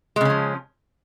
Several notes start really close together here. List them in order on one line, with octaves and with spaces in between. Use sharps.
G#3 C#3 C#4 F3